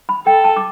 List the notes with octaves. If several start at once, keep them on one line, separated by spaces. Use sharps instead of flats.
B5
A4 G5
A5
D6